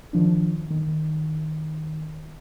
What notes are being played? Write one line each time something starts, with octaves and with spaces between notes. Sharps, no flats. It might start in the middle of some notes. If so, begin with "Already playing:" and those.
D#3 F3 D4
D#3